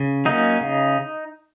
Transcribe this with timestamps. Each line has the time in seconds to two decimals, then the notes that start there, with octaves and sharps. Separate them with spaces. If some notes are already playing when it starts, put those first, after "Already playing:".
Already playing: C#3
0.25 F#3 A#3 C#4 D#4
0.61 C#3